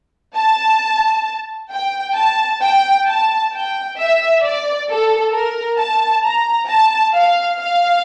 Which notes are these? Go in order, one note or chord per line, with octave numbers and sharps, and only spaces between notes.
A5
G5
A5
G5
A5
G5
E5
D5
A4
A#4
A5
A#5
A5
F5
F5